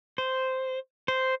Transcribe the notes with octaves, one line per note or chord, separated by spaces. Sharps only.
C5
C5